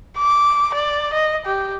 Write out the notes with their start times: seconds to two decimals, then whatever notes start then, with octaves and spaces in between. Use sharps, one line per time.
0.18 D6
0.74 D5
1.13 D#5
1.46 G4